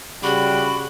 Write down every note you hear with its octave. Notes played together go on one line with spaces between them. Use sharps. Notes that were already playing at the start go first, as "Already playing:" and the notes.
C#3 G3 F#4 B5 D6